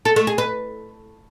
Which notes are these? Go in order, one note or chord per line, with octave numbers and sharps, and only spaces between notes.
A4
A3
G#4
B4